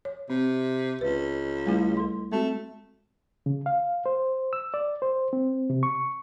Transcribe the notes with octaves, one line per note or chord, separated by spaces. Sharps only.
C#5
C3 C4
C#2 B4
G3 A3 E4
A4 C6
G#3 A3 C4 F#4
C#3
F5
C5
E6
D5
C5
C4
C3
C#6